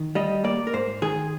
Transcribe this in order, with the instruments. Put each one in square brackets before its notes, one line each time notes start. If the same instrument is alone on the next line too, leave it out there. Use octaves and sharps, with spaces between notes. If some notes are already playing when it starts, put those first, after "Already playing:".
Already playing: [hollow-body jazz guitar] D#3
G3 D#5
A#3 D5
A#4
G#2 C5
D#3 G#4